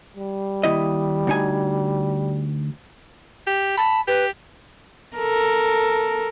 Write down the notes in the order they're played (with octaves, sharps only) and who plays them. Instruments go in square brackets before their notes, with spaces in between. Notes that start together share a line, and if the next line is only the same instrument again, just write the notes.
[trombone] G3
[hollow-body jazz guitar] D#2 E4 D#5
D2 D#4 G#5
[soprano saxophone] G4
[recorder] A5 [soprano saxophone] B5
[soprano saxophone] G4 [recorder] B4
[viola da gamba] A4 A#4